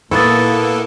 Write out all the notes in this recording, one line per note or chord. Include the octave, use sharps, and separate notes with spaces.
A#2 A#3 B3 E4 A4 C#6 D#6 A6